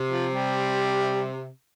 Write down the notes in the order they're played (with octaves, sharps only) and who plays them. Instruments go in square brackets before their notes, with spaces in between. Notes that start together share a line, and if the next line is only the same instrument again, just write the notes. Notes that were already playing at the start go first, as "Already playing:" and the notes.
Already playing: [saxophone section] C3
[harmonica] F3
G3